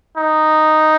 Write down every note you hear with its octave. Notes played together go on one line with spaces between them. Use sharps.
D#4